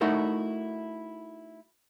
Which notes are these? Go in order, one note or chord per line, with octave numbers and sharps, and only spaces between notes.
A3 D#4 E4 F#4 A4 A#4